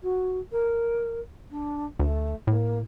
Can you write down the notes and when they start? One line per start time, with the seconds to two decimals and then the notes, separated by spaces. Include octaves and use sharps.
0.03 F#4
0.52 A#4
1.51 D4
1.99 D2 A3
2.47 A2 A#3